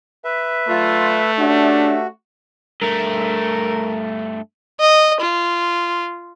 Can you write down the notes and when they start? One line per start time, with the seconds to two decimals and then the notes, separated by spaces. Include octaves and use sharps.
0.24 B4 E5
0.68 D3 F#3 A3 F4
1.39 C#4 D4 F#4 G4 E5
2.82 G2 A3 A#4
4.80 D#5
5.21 F4